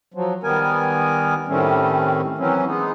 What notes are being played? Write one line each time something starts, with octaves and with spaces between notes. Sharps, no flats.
F3 F#3
D#3 G3 B3 A#4 G#5
A2 D#3 G3 A3 C4 C#4
E3 F#3 C4 C#4
G#3 B3 D#4